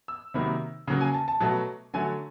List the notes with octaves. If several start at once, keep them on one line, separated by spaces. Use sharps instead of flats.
E6
C3 D#3 F#3 A#3 B5
C#3 F#3 A#3
G#5
A5
A5
B2 F#3 A3 A5
D3 F#3 A3 G#5